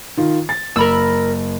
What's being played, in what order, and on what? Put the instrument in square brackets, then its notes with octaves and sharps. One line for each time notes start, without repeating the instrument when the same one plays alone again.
[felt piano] D#3 F4
A6
[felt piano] F#1 [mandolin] A#4 B5 E6